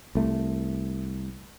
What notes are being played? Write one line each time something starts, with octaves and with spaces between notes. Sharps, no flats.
C2 A3